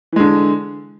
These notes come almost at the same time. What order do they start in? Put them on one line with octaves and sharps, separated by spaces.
E3 G#3 D3